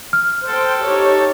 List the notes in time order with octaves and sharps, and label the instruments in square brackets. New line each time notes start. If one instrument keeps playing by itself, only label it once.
[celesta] F6
[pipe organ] A4 [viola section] C5 G5
[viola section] D#4 G4 C#5